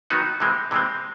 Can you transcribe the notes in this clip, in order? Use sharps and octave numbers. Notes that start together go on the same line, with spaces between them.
D#3 F#3 B3 D#4 F#4
C3 E3 G#3 C4
C3 E3 G#3 C4